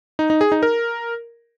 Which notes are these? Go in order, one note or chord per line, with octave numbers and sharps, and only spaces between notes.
D#4
D#4
G#4
D#4
A#4